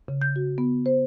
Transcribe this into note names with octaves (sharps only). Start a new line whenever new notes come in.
C#3
G6
F#4
B3
C5